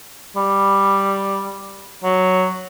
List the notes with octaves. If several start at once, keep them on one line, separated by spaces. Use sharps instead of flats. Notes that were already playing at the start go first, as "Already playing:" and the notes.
G3
F#3